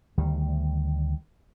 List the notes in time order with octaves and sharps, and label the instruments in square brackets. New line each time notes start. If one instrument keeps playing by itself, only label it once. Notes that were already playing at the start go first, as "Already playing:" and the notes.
[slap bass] D2 D#3 G3